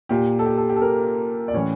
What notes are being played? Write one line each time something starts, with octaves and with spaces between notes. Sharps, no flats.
A#2 G4
A4
G4
A4
G4
A4
A#3 A#4
D5
A2 E3 C#4 C#5